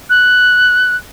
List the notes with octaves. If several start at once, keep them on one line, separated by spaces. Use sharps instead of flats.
F#6